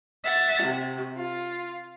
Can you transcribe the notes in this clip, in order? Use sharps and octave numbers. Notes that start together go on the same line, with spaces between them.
E5 F#5 A6
C3
F4